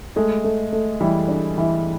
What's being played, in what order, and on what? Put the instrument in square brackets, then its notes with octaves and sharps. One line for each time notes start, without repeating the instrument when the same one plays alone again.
[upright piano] G#3 [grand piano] A3
[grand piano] A3
A3
[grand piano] E3 [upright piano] G3
[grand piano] D4
E3